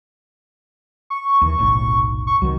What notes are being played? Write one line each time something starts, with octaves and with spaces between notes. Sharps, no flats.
C#6
D#2 E3
F1 B1 A2
C#6
C2 D#3 F#3